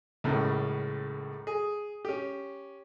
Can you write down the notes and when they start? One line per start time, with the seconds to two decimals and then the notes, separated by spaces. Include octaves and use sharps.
0.24 C#2 F#2 A2 C#3
1.47 G#4
2.05 C#4 G4